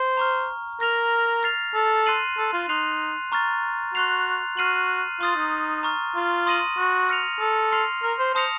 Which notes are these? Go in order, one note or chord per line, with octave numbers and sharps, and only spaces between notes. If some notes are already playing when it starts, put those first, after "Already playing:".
Already playing: C5
A#5 C#6 F6
A#4 F6 A#6 F7
F6 A6 C7 F7
A4
C6 F#6 C7 D#7 F#7
A4
F4
D#4 C6 F#6 C7 F7
A#5 C#6 F6 A6
F#4 C6 F#6 C7 F7
F#4 F6 C7 D#7 F#7
F4 C6 D#6 A6
D#4
A#5 C#6 F6
F4
C6 D#6 A#6 D#7 F#7
F#4
F6 A#6 C#7 F7
A4
C6 F6 C7 F7
A#4
C5
C5 A5 D#6 A#6 C#7 F7